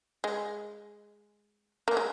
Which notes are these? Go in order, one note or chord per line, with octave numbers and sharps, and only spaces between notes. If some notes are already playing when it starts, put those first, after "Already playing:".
G#3
A#3
G#3